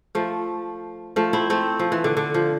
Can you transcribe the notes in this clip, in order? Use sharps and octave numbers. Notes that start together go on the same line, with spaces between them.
F3 A3
F3 A3
C4 E4
A3 C4
F3
E3
D3
D3
F3